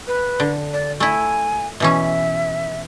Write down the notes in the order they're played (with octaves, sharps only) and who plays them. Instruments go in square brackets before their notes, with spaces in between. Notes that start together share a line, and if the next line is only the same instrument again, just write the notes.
[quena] B4
[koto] D3
[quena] D5
[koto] A3 E4 [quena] G#5
[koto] B2 E3 C#4 [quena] E5